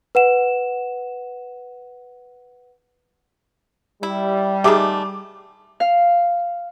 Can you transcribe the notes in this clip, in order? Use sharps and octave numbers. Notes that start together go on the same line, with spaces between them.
B4 F#5 E7
G3 E4
D#3 G#3 A3 G4 G#4 D6
F5